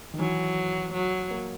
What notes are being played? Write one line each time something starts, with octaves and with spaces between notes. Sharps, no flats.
D#3
E3 F#3
F#3
A#3